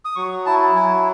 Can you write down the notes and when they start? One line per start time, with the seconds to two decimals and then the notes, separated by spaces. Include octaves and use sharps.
0.05 D#6
0.16 F#3 C#6
0.46 E4 A5
0.75 F#3 G#5